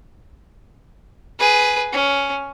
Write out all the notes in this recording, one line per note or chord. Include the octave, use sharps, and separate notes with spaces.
G#4 B4
C#4